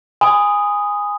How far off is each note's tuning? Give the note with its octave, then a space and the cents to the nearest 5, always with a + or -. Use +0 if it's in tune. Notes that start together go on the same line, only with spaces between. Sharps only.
G#5 -15 B5 +35 D#6 +0